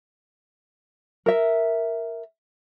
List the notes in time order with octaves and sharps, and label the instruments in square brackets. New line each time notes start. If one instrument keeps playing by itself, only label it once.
[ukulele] A#4 E5